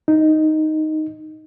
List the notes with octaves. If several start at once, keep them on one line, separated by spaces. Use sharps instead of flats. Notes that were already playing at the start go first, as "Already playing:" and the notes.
D#4